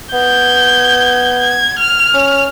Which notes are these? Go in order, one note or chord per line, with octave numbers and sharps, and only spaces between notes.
B3 G6 G#6
G#6
F6
C#4